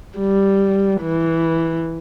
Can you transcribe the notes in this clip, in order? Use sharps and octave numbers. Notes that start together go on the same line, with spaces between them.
G3
E3